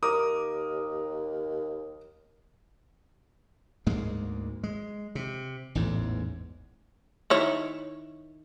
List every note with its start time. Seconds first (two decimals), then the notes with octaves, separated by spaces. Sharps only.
0.03 D#2 A#4 D6 D#6
3.86 D2 G#2 G#3 A#3
4.64 G#3
5.15 C3
5.75 A1 E2 G#2
7.30 D#3 E4 C#5